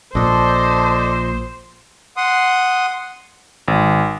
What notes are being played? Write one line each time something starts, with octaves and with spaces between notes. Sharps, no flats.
A#1 A#2 D4 A4 C5 D#5
F#5 C6 D#6
G#1